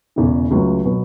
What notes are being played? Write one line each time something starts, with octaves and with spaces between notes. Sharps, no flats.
E1 E2 C#3 E3
C#2 C#3 F#3 A3
B2 F#3 B3